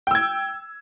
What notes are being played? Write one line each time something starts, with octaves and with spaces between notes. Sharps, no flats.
G5 E6 G#6